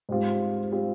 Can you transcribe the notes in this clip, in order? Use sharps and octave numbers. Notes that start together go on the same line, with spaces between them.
G#2 G3 C4 F4
G3 C4 F4